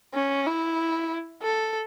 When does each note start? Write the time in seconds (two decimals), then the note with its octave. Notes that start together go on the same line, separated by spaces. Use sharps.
0.14 C#4
0.47 E4
1.42 A4